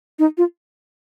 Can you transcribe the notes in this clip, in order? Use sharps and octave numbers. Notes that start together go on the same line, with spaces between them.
D#4
F4